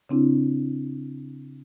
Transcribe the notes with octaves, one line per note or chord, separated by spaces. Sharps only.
C#3 C4 D4 E4